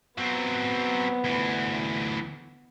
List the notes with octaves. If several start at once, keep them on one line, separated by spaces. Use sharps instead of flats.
F#3 B3 C4
D2 E3